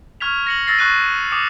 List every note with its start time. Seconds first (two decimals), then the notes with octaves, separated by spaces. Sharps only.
0.20 C#6 F6 G#6 B6 F7
0.47 A#6 C#7 F#7
0.67 E6 A6 A#6 C7
0.79 C#6 F#6 D#7
1.32 D6 D#6 C#7